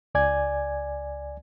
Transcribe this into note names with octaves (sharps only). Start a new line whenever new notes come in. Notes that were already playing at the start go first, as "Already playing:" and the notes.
C#2 D5 G#5 G#6